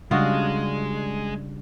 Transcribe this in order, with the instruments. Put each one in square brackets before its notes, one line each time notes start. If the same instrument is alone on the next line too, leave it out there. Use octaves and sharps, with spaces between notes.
[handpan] C#3 G3 D4 [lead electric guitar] G#3 [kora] F4 F#4 D#5